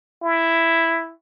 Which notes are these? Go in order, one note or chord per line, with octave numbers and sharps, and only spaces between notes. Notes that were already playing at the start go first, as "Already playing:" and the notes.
E4